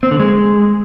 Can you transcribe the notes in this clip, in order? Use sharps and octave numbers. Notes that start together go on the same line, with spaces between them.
C4
D3
G#3